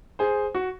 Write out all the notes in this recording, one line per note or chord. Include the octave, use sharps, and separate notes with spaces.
G#4 C5
F#4